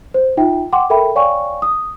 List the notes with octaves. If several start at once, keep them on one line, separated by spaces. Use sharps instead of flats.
C5
D#4 F4 E5 G5
F#5 G5 C6 D6
A4 A#4 E5 G5 B5
C#5 D5 F5 G5 G#5 C#6
D#6